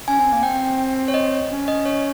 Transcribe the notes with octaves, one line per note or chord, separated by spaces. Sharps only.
C#4 G#5
C4
A#3
C4 G5
C#5
D#5
C#4
D#5
C#5